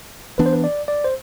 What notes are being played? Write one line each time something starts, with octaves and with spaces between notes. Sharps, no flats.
E3 B3 D4 B4
C5
B4
D5
D5
C5